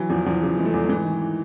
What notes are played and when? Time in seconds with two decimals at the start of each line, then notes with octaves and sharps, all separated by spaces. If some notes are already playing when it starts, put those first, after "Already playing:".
Already playing: E3 F#3
0.09 E2 F3
0.26 E2 F3
0.42 C#3
0.57 E3 G#3
0.65 A3
0.73 E2
0.89 G#2 E3
1.05 D#3